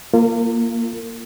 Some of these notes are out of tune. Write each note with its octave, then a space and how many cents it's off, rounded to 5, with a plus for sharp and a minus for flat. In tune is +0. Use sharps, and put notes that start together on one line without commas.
A#3 +0 F4 -25 A#4 -40